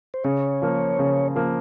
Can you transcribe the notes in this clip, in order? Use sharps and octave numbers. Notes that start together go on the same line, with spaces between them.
C5
C#3 C#5
F3 A#3
C#3
F3 A#3